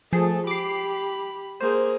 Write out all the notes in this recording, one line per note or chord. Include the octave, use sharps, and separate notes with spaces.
F3 A3 G#4 A4
G4 B5 D6 C7
A#3 G#4 C5